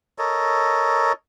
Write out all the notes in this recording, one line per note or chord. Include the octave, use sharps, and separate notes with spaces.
A4 A#4 C#5 D#5